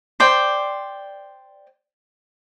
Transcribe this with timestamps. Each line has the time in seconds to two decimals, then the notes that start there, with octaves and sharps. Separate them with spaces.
0.20 C5 D5 G5